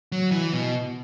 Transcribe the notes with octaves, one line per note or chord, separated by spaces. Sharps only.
F#3
E3
B2